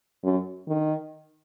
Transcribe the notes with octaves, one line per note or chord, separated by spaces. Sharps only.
F#2
D#3